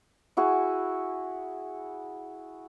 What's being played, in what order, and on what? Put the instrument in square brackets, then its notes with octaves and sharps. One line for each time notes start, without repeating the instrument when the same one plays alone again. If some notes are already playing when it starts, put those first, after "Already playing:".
[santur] E4 F#4 G#4